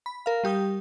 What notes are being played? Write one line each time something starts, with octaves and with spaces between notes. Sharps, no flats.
B5
A#4 F5
G3 G4 D#6 G6